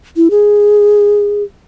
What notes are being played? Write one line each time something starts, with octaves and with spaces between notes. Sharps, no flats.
E4
G#4